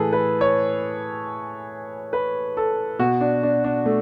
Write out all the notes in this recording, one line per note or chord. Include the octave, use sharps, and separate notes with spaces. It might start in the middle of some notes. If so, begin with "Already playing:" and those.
Already playing: A2 E3 G#4 A4 B4
B4
C#5
B4
A4
B2 F#4
D4
D4
D4
A3